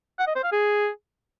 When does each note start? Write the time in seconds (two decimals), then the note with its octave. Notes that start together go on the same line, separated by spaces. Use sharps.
0.19 F#5
0.27 D#5
0.35 C5
0.44 F5
0.52 G#4